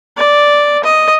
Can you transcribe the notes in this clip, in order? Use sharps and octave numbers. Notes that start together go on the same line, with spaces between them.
D5
D#5